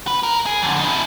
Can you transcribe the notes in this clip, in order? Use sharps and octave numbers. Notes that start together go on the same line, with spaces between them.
B4
A#4
G#4
F2 D3
D#4 E4